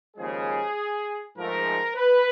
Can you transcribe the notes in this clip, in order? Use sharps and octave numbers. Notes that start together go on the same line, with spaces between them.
D#2 C#3 F3 G#3 G#4
G#2 F3 A3 A#4
B4